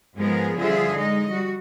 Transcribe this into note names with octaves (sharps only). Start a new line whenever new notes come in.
G#2 F3 G#3 B3 G#4 A#4
D3 F3 G3 F4 G#4 E5
G#3 D#4 D#5
G3 F#4